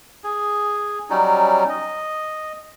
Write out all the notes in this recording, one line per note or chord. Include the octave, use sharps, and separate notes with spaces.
G#4
F#3 G3 C#4 D#4
D#5